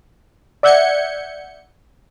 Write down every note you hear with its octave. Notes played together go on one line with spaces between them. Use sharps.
D5 E5 F#5 G6 G#6 C#7